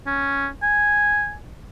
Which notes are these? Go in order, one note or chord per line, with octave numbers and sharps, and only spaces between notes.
C#4
G#5